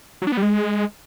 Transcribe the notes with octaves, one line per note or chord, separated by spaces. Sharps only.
F#3
D4
B3
G3
G#3